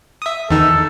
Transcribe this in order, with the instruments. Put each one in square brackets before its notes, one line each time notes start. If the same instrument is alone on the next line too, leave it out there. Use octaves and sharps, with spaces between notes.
[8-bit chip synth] E5 D#6
[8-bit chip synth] E2 D#3 D#4 [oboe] A4